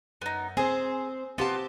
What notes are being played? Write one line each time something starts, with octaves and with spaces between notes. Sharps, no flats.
F#2 B3 D#4
C4 G#4 C5
B3 C4 F4 G4 A5